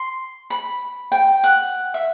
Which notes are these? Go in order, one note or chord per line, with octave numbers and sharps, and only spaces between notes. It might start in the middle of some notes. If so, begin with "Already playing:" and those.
Already playing: C6
B5
G5
F#5
E5